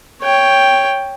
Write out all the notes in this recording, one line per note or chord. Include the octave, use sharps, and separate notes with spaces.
C#5 G5